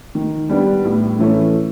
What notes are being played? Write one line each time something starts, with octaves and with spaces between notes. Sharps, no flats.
D#3
G3 B3 D4
A2
E3 A3 C#4